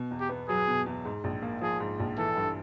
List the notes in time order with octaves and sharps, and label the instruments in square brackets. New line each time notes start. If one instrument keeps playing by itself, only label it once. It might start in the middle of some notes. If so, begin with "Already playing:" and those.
Already playing: [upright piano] B2
E2
[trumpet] G4
[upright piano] B3
[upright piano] F#3 [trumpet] G#4
[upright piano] B2
E2
G#2
A#1
A#3
[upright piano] F3 [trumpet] G#4
[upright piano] G#2
A#1
[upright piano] E3 [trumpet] A4
[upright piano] G2